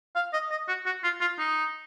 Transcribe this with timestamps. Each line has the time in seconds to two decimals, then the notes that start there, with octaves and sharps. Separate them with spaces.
0.15 F5
0.33 D#5
0.51 D#5
0.68 F#4
0.86 F#4
1.04 F4
1.21 F4
1.38 D#4